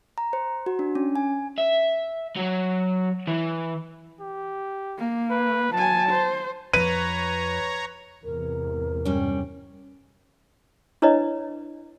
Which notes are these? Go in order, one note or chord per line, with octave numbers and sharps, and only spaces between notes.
A#5
C5
F#4
D4
C#4
G#5
E5
F#3
E3
G4
A#3
B4
F#3 G#5 A5
C5
F2 F3 B4 C#5 A#5 D#7
E2 G#2 C3 A#4
G2 G3 C#4
D4 E4 B4 C#5 D#5